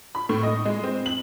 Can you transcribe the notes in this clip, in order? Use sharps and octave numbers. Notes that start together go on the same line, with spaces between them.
B5
A2
D#5
G#3
C4
F#7